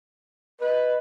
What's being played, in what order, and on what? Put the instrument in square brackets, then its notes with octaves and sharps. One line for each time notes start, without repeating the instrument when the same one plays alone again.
[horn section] B4 [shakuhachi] D#5